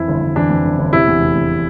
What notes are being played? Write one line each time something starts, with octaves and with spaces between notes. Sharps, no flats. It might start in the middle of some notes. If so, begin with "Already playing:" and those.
Already playing: F2 E3 E4
G1
G1
E3 D4
F2
G1
G1
C3 E4
E2
F1
F1
C3